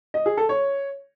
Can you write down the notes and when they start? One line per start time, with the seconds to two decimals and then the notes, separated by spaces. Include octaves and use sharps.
0.14 D#5
0.26 G#4
0.37 A4
0.49 C#5